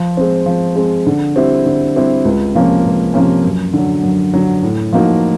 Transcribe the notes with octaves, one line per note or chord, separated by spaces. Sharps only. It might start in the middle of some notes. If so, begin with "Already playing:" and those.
Already playing: F3
G#3 C4
F3
G#3 C4
D3
G3 C4 E4 G4
D3
G3 C4 E4 G4
C#2
C3 F3 A#3 C#4
C#2
C3 F3 A#3 C#4
F#2
D3 F#3
F#2
D3 F#3
A2
F3 A#3 D#4 F#4